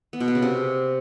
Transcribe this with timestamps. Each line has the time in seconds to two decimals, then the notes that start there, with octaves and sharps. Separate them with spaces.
0.13 B3
0.20 B2
0.28 B3
0.35 C#3
0.42 C3